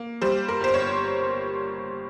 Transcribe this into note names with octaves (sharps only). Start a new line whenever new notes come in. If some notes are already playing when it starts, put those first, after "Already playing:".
Already playing: A#3
G3 C5
A#4
G1 C5
C#5